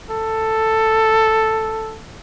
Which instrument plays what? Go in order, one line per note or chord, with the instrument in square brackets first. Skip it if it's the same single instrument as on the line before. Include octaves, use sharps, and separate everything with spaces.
[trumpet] A4